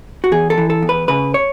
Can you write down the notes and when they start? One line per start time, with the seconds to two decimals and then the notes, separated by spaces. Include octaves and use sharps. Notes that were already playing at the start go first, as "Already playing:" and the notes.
0.24 F#4
0.32 E2 G#4
0.50 A4
0.58 E3
0.70 A4
0.82 E2
0.89 B4
1.08 C#3 B4
1.34 C#5